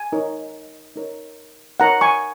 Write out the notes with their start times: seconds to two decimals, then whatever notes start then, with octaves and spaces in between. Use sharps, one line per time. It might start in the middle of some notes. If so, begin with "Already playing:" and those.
Already playing: G#5
0.12 D#4 A#4 C#5
0.96 D#4 A#4 C#5
1.80 D#4 A#4 C#5 F#5 A#5
2.01 G#5 C#6